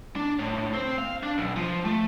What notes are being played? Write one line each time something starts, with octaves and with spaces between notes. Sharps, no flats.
D4
A2
C4
F5
D4
B1
F3
A3